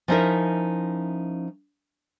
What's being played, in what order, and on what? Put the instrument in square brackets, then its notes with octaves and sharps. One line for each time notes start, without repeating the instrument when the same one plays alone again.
[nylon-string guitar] F3 C#4 D#4 E4 A#4 E5